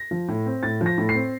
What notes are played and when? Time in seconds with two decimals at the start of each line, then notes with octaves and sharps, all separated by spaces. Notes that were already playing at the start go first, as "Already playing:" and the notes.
Already playing: A#6
0.11 F3
0.28 A2
0.46 C4
0.63 A2 A6
0.81 F3
0.86 A#6
0.98 A2
1.09 C7
1.14 C4